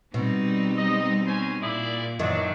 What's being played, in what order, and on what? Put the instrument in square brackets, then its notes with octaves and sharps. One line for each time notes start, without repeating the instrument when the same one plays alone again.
[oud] B2 [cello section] G3 [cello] C4 D#4
[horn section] D#5
C#4 C5 G#5
[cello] A#2 [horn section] E4 G#4 D5
[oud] F#2 D#3 [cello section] E3 [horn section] F#3 D4